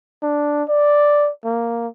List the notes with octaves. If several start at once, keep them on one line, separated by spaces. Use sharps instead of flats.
D4
D5
A#3